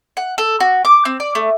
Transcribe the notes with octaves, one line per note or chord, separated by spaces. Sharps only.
F#5
A4
F#4
D6
C4
D5
A3